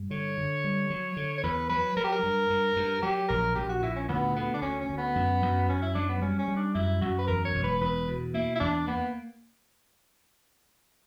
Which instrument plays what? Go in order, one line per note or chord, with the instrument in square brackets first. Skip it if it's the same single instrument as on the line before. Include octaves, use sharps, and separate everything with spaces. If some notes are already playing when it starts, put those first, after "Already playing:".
Already playing: [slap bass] G2
[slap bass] D3 [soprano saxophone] C#5
[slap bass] D3
G3
F#3
D3
[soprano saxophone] C#5
[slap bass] E2 [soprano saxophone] B4
[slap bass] F#3 [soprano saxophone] B4
[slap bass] F#3 [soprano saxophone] A#4
[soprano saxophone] G4
A#4
[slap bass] G2
G2
G2
[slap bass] F#3 [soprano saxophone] G4
[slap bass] A#1 [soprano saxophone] A#4
[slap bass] A#1 [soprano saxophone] G4
[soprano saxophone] F#4
[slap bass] A#2 [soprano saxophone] E4
[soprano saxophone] C#4
[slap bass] D2 [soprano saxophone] B3
[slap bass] D3 [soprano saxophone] B3
[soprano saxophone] D4
[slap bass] D2 [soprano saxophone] C#4
[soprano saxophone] C#4
[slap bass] D2
[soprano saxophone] B3
[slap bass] F#2
F#2
[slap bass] F#2 [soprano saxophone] C#4
[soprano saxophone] E4
[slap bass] F#3 [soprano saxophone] D4
[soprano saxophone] B3
[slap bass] G3 [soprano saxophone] C#4
[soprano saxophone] C#4
[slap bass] G3
[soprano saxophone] D4
[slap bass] F#2 [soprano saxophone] E4
[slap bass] F#2 [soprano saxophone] F#4
[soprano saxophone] B4
[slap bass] E2 [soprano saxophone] A#4
[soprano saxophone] C#5
[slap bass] E1
[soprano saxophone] B4
[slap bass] E2 [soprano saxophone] B4
[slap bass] B2
[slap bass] A#3 [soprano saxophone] E4
[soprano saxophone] E4
[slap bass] E2 [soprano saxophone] D4
[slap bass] A#3 [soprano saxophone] B3